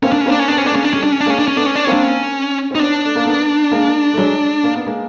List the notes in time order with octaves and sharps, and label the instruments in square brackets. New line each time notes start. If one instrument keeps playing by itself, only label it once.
[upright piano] A#3 C4 [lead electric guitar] C#4
[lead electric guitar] D4
C#4
[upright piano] A#3 C4
[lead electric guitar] D4
C#4
[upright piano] B3 [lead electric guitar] D4
[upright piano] C4 [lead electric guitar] C#4
[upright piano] A3 B3
[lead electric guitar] D4
[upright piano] G#3 A#3
[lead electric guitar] C#4
D4
[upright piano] G3 A3 [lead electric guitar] C#4
[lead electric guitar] D4
C#4
D4
[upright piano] G#3 A#3 [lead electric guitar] C#4
[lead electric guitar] D4
C#4
[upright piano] A3 B3 [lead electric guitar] D4
[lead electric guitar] C#4
D4
[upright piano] A#3 C4 [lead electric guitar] C#4
[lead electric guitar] D4
C#4
[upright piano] C4
[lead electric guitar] D#4
[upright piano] B3 C#4 [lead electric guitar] D4
[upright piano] A3
A#3
A3 B3
G#3 A#3
A3
F#3 G#3
A#3
B3
G#3 A#3